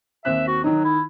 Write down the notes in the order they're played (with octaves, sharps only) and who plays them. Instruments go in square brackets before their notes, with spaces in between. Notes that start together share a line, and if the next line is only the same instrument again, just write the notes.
[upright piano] D#2 C4 F#6 [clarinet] E5
[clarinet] F#4
[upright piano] D#3 D#4 [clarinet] F#3
[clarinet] E4